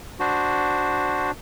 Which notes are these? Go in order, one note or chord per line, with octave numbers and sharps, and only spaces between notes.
D4 F#4 C5